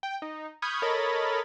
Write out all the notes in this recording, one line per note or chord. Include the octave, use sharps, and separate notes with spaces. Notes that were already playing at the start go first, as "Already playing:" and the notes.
G5
D#4
B5 C#6 D#6 F6 G6 G#6
A4 A#4 C#5 D#5 B5 A6